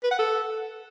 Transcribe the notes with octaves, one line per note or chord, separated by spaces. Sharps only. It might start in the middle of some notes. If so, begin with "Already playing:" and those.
B4
F#5
A4